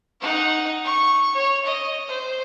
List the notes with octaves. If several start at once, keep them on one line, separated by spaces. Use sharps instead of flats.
D#4 F#5
C#6
C#5
D#5
C5